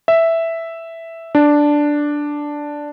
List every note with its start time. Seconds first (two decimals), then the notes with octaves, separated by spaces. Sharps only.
0.08 E5
1.35 D4